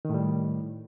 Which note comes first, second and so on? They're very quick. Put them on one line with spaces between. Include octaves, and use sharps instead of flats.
D#3 A2 G3